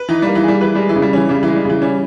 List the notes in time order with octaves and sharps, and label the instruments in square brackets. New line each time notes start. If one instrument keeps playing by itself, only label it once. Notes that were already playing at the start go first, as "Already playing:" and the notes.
Already playing: [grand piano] B4
[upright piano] E3 [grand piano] D#4
[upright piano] G3 [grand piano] A#3
[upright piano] E3
[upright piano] G3 [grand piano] G#4
[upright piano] E3 [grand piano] B4
[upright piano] G3 [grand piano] G#3
[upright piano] E3
[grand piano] C#3
[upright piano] G3
[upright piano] E3 [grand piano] C#4
[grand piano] C#3 [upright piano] G3
[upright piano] E3 [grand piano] G#3
[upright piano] G3
[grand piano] C#3 [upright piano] E3
[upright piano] G3 [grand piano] C#4